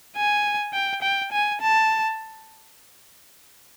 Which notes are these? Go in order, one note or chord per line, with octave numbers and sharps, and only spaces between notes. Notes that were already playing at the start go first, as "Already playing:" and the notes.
G#5
G5
G5
G#5
A5